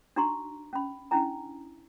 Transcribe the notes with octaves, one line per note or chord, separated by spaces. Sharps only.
D4 D#4 F#4 A#5 C6 C#6
C#4 B5
C#4 D4 E4 G#5 A#5